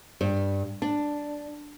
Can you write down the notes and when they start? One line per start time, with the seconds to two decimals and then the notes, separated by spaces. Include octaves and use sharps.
0.21 G2
0.82 D4